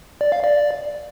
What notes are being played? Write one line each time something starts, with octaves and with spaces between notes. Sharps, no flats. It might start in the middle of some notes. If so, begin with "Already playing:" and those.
D5
F5
D5